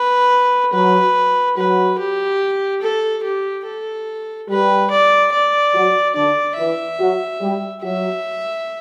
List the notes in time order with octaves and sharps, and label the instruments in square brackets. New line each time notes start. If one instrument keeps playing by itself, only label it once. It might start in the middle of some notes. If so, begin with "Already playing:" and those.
Already playing: [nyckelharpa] B4
[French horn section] F#3 F#4 [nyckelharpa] B4
[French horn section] F#3 F#4 [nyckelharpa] B4
[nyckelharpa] G4
A4
G4
A4
[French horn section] G3 G4 [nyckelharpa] B4
[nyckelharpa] D5
D5
[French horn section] F#3 F#4
[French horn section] D3 D4 [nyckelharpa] D5
[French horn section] E3 E4 [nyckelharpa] E5
[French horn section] F#3 F#4
G3 G4
[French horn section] F#3 F#4 [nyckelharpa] E5